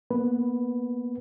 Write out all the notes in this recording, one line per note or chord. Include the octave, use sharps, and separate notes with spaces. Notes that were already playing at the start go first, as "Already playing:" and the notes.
A#3 B3 B4